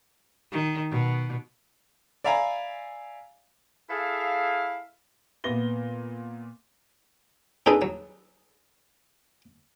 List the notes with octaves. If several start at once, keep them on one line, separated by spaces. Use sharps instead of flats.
D#3
B2
D5 E5 F5 G#5 A#5 B5
E4 G#4 A4 F5
A#2 B3 A#6 G7
C4 D4 D#4 G#4 A4 B4
F#3